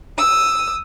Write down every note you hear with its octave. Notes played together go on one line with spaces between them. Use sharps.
D#6 E6